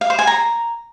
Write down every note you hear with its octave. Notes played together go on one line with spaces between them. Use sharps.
F5
C5
G#5
A#5